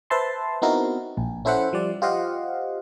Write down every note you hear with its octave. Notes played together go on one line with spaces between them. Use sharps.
B4 C5 E5 A5 C6
B3 C4 D#4 E4 F#4 A#4
A#1
C#4 E4 A4 C5 E5 F#5
F3 G3 D5
F4 G4 C5 D#5 F5 F#5